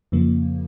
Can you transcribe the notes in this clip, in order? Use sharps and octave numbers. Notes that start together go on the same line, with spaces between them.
F2 C#3 F3 A#3